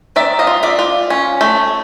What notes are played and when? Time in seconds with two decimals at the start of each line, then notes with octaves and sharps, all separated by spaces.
0.16 D#3 D5 E5
0.39 D#5 F5
0.47 F4
0.63 D5 E5
0.79 F4
1.10 C#4
1.41 A3